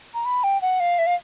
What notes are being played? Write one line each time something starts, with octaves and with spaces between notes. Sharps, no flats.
A#5
B5
G5
F#5
F5
E5
F5